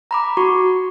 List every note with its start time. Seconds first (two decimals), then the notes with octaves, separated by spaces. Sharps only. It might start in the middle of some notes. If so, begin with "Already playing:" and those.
0.11 A#5 B5 D6
0.37 F#4 C#6